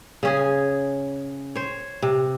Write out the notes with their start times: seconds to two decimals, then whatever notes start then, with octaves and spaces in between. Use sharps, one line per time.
0.23 C#3 C#4 G#4
1.55 C5 C#5
2.02 C3